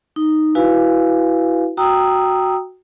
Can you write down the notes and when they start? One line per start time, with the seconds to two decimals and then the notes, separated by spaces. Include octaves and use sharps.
0.16 D#4
0.55 E4 F#4 B4 F5 G#5
1.77 F#4 G5 A#5 D#6 E6